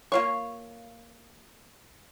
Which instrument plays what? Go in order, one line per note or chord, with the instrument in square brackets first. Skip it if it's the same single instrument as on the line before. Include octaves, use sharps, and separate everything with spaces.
[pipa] A#3 F4 C#6 [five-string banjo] C#5